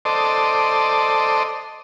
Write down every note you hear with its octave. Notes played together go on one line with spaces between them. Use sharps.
A4 C5 D5 D#5